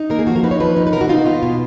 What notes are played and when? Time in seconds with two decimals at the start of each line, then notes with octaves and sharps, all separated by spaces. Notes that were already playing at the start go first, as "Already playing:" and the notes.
Already playing: D#4
0.10 A#3 A#4
0.19 G#4
0.27 F3 F#4
0.36 A#4
0.44 D#4 B4
0.51 C#5
0.60 F3 B4
0.76 D#4
0.87 B4
0.92 B2 A#4
1.01 F#4
1.09 D#4 F4
1.18 F#4
1.26 B3 F4
1.43 B2